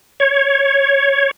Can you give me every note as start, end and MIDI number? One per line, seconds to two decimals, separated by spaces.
0.20 1.31 73